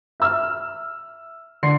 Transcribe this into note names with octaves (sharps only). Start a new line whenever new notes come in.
E5 E6 F6
D3 C6 C7